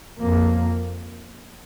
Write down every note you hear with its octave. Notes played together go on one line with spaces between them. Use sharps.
F2 A#3